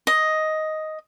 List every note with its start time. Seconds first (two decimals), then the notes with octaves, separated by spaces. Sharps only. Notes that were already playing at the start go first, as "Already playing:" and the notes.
0.07 D#5